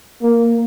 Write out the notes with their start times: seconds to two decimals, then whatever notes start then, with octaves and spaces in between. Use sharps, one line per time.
0.22 A#3